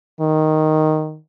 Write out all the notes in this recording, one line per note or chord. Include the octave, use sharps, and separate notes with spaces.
D#3